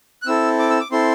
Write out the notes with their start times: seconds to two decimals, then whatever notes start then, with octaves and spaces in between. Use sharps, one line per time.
0.22 F#6
0.26 C4 E4 A4 E6
0.59 D6
0.70 E6
0.80 D6
0.92 C4 E4 A4 C6